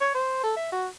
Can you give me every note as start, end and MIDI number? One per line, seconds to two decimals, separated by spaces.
0.01 0.12 73
0.15 0.41 72
0.43 0.53 69
0.57 0.69 76
0.72 0.87 66